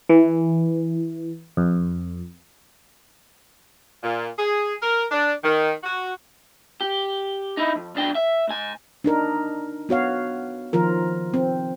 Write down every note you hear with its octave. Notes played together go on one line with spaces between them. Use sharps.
E3
F2
A#2
G#4
A#4
D4
D#3
F#4
G4
D#4 E4
F2
B1 D4 G5
E5
G#2 G#5
D4 D#4 A#4
B3 F#4 C#5 F5
D#3 F3 F4 A#4
C4